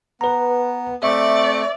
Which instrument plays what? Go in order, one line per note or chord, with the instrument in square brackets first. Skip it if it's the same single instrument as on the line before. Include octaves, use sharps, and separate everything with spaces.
[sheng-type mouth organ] B3 [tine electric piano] B4 A#5
[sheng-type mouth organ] A3 C4 C#6 [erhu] D5 [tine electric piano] E5